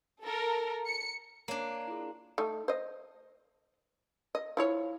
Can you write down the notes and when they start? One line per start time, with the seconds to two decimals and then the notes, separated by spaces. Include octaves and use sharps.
0.23 A4 A#4
0.86 C#7
1.48 A#3 D4 C#5 A#5
1.87 E4 F4 G#4
2.38 A3 D#4
2.68 C5 D#5
4.35 D#5
4.57 F3 E4 C#5